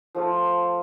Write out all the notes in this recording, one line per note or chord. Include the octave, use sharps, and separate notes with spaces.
F3 A3 F4